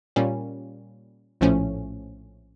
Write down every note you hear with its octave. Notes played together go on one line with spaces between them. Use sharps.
A#2 G3 A#3 C#4
A#1 A2 F3 A3 C#4